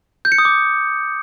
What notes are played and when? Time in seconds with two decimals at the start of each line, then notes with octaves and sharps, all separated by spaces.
0.25 G6
0.32 C#7
0.38 D#6
0.45 D6